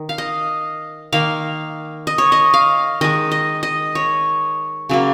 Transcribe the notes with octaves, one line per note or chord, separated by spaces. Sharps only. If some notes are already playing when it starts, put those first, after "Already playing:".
Already playing: D#3
F5
D#5
D#3 A#3 F5
D#5
C#5
D#5
F5
D#3 G#3 D#5
D#5
D#5
C#5
C#3 F#3 A#3